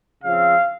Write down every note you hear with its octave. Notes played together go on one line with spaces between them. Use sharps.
C#3 F3 C4 F5